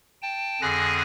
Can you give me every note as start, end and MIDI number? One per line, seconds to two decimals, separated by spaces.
0.22 0.61 79
0.22 0.61 81
0.61 1.02 41
0.61 1.02 50
0.61 1.02 68
0.61 1.02 80
0.61 1.02 90
0.61 1.02 94